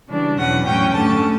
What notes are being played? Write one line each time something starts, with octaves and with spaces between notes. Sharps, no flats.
C#3 E3 G3 D4
E2 B2 F#3 C#4 F#5
A2 F#3 C#4 G5
G2 D3 A3 C#4 A5